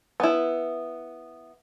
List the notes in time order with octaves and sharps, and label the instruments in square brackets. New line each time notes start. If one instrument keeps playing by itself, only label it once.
[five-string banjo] B3 E4